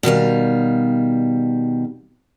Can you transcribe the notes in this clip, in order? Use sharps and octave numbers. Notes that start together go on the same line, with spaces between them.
B2 D#3 G3 F5